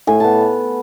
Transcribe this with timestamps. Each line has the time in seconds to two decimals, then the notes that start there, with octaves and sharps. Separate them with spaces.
0.07 A2 G#5
0.20 B3 A5